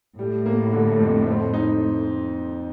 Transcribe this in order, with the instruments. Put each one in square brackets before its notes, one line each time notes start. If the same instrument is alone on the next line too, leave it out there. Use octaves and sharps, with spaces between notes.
[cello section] A2 [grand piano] G3
[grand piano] A#3
D3
F2
C4
D#4